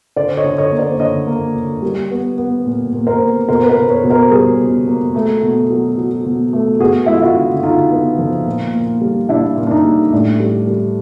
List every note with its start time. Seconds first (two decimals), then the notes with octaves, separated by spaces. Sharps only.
0.16 D3 C5 D5
0.37 C#5 D#5
0.44 D3
0.58 C#5 D#5
0.72 A#3
0.79 C5 D5
1.00 D3 C#5 D#5
1.27 A#3
1.55 D3
1.83 G3
2.10 B3
2.38 B3
2.66 A#2
2.93 A#2
3.07 A#4 C5
3.21 B3
3.48 B2 A#4 C5
3.64 B4
3.69 A#4 C5
3.76 B2
3.90 B4 C#5
4.04 B2
4.10 A#4 C5
4.31 G3 G#4 A#4
4.60 B2
4.87 A#3
5.15 A3
5.42 B2
5.70 F#3
5.98 F#3
6.25 B2
6.53 A3
6.80 B3 F#4 G#4
7.06 G#3 E4
7.14 F4
7.22 E4 F#4
7.36 D3
7.58 F#4
7.63 D3 D#4 F4
7.91 B3
8.19 F3
8.46 A#2
8.74 A#2
9.01 G3
9.29 A#2 D4 E4
9.57 A#2
9.67 D4
9.71 D#4
9.85 G3
10.12 A2 D4
10.40 G3
10.67 G3